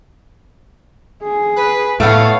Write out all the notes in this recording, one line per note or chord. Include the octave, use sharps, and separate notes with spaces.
G#4
B4
A2 A3 B3 C#5 F5